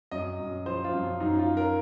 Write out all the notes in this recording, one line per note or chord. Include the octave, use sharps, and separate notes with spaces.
F#2 D#5
F#2
F3 C5
F4
F#2
F#2 D#4
F4
F#3
A#4